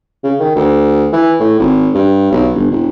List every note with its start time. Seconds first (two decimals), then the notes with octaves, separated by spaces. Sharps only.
0.24 C#3
0.39 D#3
0.55 D2
1.12 E3
1.39 A2
1.59 G#1
1.94 G2
2.31 B1
2.55 G1
2.71 E1